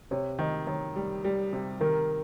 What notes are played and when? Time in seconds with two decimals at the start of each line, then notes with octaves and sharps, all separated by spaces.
0.11 C3 C#5
0.39 D#3 D#5
0.67 D#3 C#5
0.96 G3
1.25 G3
1.53 C3
1.80 D#3 A#4